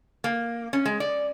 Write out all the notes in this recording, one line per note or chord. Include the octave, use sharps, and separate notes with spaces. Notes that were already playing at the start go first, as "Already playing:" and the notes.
A#3
C#4
G#3
D5